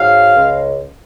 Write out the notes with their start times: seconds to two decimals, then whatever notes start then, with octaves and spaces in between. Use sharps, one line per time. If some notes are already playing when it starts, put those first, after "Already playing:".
Already playing: G#2 F#3 F5
0.35 C#2 C#3 G#3